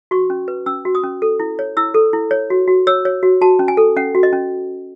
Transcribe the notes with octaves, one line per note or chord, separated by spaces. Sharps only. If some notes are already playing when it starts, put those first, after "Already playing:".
F#4 C#6
C#4
B4
C#4 E6
F#4
D#6
C#4
A4
E4
C#5
E4 E6
A4
E4
C#5
F#4
F#4
C#5 E6
C#5
F#4
F#4 A5
C#4
G#5
A4
C#4 F#5
F#4
D#5
C#4